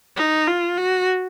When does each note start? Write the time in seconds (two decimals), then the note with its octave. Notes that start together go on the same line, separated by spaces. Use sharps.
0.16 D#4
0.47 F4
0.78 F#4